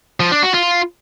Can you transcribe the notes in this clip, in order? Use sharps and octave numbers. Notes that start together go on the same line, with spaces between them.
F3
D4
F#4
F4